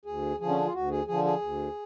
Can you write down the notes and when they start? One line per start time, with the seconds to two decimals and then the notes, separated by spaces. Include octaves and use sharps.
0.05 D2 G#4
0.40 D3 F3 G#4
0.48 C#4
0.57 D4
0.65 F4
0.74 D2 F#4
0.90 G#4
1.07 D3 F3 G#4
1.25 G#4
1.42 D2